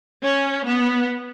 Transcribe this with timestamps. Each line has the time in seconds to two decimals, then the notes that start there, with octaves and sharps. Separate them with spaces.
0.21 C#4
0.65 B3